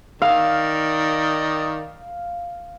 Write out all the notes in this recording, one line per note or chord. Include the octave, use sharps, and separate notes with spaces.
D#3 D5 D#5 F5